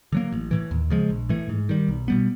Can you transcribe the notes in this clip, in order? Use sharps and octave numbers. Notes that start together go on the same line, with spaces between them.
D3 F#3 A#3
A1
A2 E3
D#2
C#3 F3 G#3
A#1
A2 E3 A3
G#2
D#3 G3
B1
B2 G3 B3